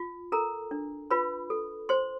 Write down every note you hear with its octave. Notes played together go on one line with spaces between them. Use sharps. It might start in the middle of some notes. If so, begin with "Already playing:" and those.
Already playing: F4
A4 A#4 A#5
D4
F4 B4 B5
A4
C5 C6